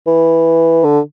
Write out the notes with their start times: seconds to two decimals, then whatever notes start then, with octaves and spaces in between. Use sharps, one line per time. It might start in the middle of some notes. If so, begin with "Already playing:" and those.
0.07 E3
0.84 D3